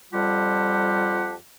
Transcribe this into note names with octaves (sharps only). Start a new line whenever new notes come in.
F2 G3 F4 G4 F#5 A5